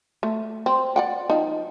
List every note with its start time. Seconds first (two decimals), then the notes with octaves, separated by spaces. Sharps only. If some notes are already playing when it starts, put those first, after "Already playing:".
0.23 A3
0.66 C4
0.96 D5 F#5 G5
1.30 F3 D#4